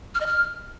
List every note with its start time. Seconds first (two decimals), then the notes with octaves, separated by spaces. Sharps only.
0.15 F6
0.21 D#5
0.26 F6